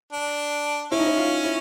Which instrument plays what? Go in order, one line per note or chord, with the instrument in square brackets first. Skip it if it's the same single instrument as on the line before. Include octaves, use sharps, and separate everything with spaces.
[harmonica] D4
[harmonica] C#4 [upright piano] E4
[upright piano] D#4
E4
F4
E4